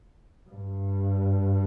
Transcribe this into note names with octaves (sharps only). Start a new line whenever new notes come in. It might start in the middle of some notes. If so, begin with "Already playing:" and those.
G2